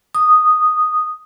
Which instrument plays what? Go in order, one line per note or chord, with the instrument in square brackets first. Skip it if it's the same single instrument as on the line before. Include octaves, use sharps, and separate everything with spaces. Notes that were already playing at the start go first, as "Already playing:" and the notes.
[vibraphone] D#6